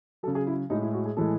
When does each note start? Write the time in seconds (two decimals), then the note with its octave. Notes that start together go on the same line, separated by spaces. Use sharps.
0.23 F#3 A4
0.27 C#3
0.35 G#4
0.47 E4
0.70 A2 G#3 D#4
0.82 E4
0.94 F#4
1.06 G#4
1.17 A2 E3 G#3 A4